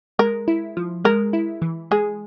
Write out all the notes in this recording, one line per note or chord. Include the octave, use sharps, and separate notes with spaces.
G#3 A#4
E4
F3
G#3 A#4
E4
E3
G#3 G#4